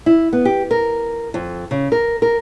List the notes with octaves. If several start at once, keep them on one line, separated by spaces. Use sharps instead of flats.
E4
B3
G4
A#4
F2
C#3
A#4
A#4